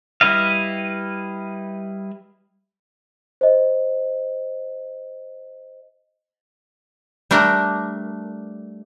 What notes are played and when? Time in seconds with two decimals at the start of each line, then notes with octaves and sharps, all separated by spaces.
0.21 G3 E4 B4 D#5 F5
3.41 C5 D#5
7.31 G3 A3 D4 A#4